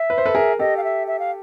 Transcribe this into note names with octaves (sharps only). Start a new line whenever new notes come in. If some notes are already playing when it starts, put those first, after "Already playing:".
Already playing: E5
B4
C5
A4 B4
G#4 A#4
G4 A4 D#5
F5
E5
E5
F5